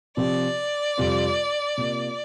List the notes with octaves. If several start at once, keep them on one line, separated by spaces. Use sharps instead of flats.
C3 F3 C4 G4 D5
F2 C3 G3 C4 F4
C3 A#3 F4